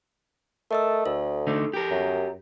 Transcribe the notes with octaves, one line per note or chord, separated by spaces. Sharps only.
A3 A#4 D#5 E6
D2 A4
D3 A3 D#4
G4 A#4
F#2